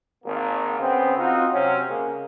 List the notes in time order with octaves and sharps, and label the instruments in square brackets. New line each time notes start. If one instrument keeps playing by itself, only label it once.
[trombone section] G#1 A#3
C#3 B3 C4
C4 D#4 F4 F#4
C3 F#3 C4 C#4
C#3 G#3 A#3